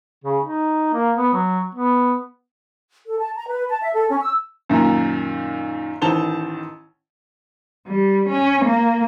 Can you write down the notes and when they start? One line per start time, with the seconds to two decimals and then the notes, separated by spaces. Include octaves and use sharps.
0.24 C#3
0.43 D#4
0.93 A#3
1.17 B3
1.33 F#3
1.75 B3
3.06 A4
3.18 A5
3.36 A#5
3.48 B4
3.69 A5
3.81 E5
3.93 A4
4.09 C#4
4.22 E6
4.69 F#2 A#2 D#3 A#5
6.02 A1 D#3 C5 A5 F7 G7
7.87 G3
8.29 C#4
8.65 A#3